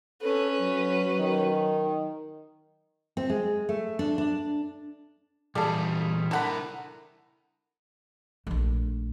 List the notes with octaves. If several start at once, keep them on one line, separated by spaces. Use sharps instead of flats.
C#4 A4 B4
F#3
D#3
C4
G#3
A3
D4
D4
A#2 E3 G3 G#4 A4 D5 F5
D3 E4 A#4 F#5 B5
A#1 A3